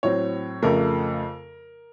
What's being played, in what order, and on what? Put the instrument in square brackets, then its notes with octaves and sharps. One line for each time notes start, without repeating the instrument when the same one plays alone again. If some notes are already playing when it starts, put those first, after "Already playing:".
[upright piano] A2 F#3 C4 C#5
F2 C#3 A3 A#4